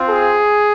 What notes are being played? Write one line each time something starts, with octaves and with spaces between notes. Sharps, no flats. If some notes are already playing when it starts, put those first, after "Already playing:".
Already playing: C4 F4
G#4